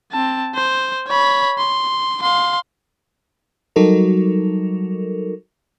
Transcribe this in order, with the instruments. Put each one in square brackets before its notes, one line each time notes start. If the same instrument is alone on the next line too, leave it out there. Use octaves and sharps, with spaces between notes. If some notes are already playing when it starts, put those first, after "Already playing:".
[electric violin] C4 A5
C5
C#5 B5
C6
F5 C6
[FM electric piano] F#3 G3 D#4 F#4 A4 A#4